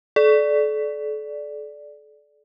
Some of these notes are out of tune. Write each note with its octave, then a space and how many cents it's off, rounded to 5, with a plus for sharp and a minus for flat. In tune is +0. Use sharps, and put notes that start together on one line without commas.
A4 -35 D5 +0